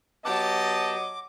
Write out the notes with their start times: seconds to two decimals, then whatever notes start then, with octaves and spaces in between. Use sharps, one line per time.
0.25 F#3 B3 G4 D#5 A5 D6